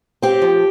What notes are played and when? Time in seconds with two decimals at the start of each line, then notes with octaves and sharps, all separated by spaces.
0.22 C4 G4
0.42 F3